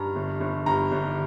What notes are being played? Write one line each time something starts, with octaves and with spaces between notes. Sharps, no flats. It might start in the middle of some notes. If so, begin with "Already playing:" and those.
Already playing: G2 A#5
G1
G1
G2 A#5
G1